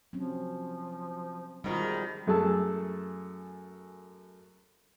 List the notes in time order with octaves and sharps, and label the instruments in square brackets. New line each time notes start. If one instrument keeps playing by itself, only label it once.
[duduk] F3 [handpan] F#3 C4 C#4
[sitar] G#2 B2 D#3 [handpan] G3 F4
[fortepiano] F#2 A3 G#4 A4 A5 E6